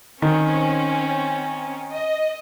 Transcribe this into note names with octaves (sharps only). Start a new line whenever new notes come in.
D#3 C4 C#4
D#5